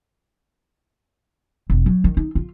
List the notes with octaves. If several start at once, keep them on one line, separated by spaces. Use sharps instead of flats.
E1
F#3
D#3
D#4
F4